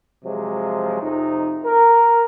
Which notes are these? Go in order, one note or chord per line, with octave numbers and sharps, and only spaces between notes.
C3 F3 F#3 G#3
F2 C3 D#4
A#4